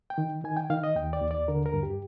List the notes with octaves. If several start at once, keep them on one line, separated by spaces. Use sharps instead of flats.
G5
D#3
D#3 G#5
G5
D#3 F5
D#5
D#2 G5
D5
D#2
D5
D3 A#4
A#4
G2
G4